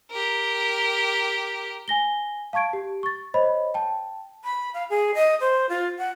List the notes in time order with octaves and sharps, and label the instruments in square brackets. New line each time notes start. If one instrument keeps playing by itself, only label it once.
[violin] G4 A#4
[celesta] G#5 A#6 G7
F5 A5 C#6 G#6 D7
G4
C#6 A6
C5 C#5 D#5 B5
G5 A5
[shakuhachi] B5
F5
G#4
D#5
C5
F4
F#5